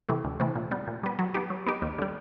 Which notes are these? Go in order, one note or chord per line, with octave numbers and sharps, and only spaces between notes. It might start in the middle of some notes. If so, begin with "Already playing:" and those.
C3 E3 A3
D2
C3 E3 A3
A#2
G3 B3
A#2
G3 B3
F#3
B3 D#4 G4
F#3
B3 D#4 G4
D#2
D3 G3